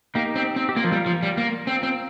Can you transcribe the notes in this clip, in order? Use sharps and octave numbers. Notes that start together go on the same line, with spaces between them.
A#3 D#4 G4
C4
C4
G4
A#3 F4 A#4
F3
G3
F3
G3
A#3
C4
C4